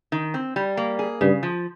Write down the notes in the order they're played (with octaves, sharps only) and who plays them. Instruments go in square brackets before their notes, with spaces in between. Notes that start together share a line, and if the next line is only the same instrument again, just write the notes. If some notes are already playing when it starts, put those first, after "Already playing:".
[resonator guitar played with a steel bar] D#3
C4
G3
A#3
G#4
[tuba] G2 [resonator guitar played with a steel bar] C#3
[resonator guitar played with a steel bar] F3